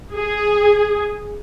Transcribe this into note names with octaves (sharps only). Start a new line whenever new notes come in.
G#4